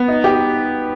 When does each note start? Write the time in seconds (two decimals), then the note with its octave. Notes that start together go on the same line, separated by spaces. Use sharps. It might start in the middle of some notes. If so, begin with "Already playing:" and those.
Already playing: B3
0.08 D#4
0.24 G4